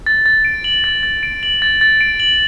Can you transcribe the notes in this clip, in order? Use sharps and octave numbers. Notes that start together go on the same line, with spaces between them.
A6
A6
D7
F#7
A6
A6
D7
F#7
A6
A6
D7
F#7